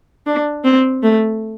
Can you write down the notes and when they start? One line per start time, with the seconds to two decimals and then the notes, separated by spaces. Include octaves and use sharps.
0.26 D4
0.64 C4
1.03 A3